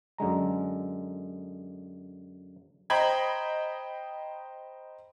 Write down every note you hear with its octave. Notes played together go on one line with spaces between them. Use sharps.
F#2 D3 G#3 A#5
C5 D#5 G5 A#5 B5 G#6